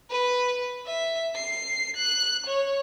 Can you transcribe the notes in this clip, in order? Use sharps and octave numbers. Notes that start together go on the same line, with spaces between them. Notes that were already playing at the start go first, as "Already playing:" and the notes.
B4
E5
C7
F#6
C#5